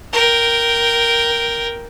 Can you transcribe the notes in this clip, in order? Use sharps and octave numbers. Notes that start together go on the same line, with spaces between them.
A#4 G5